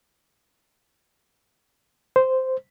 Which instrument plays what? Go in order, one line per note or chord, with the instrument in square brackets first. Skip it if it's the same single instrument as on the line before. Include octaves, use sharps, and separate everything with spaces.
[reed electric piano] C5